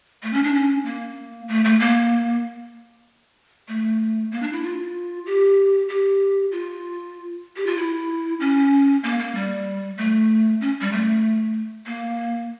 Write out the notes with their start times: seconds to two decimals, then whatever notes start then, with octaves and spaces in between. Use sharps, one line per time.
0.23 A3
0.33 C#4
0.44 D4
0.54 C#4
0.85 A#3
1.48 A3
1.65 A3
1.80 A#3
3.68 A3
4.32 A#3
4.42 D4
4.53 E4
4.63 F4
5.26 G4
5.89 G4
6.52 F4
7.56 G4
7.67 F4
7.77 E4
8.40 C#4
9.03 A#3
9.19 A#3
9.35 G3
9.98 A3
10.61 C#4
10.81 G3
10.92 A3
11.86 A#3